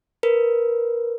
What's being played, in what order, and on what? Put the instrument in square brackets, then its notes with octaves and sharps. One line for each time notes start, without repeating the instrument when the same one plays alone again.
[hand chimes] A#4 B4